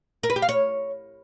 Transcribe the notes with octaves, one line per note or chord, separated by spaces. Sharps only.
A#4
B4
G4
F5
C#5